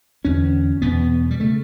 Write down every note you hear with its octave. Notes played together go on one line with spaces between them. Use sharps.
E2 D3 C#4
E2 B2 B3
G3
C#3 A3